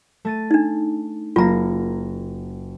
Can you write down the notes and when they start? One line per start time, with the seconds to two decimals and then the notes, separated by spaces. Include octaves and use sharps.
0.25 A3 A6 D#7
0.51 D4 D#4
1.36 F#1 A#3 F4 A#5 A#6